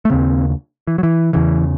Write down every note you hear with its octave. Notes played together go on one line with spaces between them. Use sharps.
A3
D#2 C#3 C4
E3
F#3
E3
E2 C#3 E3